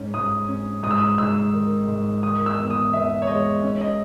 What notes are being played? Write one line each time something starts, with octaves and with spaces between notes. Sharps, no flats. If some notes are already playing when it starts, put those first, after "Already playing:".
Already playing: G#2 C#4
G#2 D#6
C#4
G#2 D#6
E6
D#6
G#2 E6
D#3
G#2
D#3 D#6
E6
E2
D#6
E2 E5
C#5
G#3 D#5
C#4
D#5